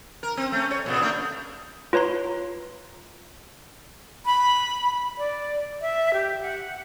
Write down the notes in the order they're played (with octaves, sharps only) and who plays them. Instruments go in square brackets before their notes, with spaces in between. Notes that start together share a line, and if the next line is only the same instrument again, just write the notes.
[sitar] A#4
C4
A3 C#4
C#5
A#2 C#3 B3
A3 A#3 D4
[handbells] F4 B4 C#5 A#5 C6
[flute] B5
D5
E5
G4
F#5